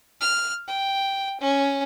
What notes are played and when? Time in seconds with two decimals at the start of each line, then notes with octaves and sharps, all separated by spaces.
0.21 F6
0.68 G5
1.41 C#4